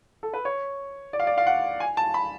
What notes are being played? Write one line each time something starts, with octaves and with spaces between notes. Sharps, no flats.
A4
B4
C#5
D5
F5
D5
F5
F#5
G#5
A5
B5